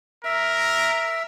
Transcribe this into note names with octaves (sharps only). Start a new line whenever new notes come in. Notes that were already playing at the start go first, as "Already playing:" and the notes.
A#4 E5